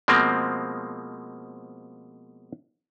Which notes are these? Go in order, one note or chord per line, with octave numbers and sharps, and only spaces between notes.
B2 F3 G#3 A#3 C4